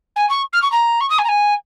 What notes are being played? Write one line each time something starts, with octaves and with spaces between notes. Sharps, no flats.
G#5
C#6
F6
C#6
A#5
C#6
D#6
G#5
A#5
G#5